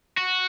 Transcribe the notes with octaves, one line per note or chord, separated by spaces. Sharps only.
F#4